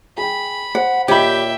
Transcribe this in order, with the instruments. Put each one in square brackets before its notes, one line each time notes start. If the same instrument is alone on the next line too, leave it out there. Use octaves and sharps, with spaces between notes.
[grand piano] G#4 G5 [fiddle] B5
[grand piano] C5 [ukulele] F#5
[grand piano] A#2 D#5 [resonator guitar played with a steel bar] G4 [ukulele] C#5 B5 [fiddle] E5 G5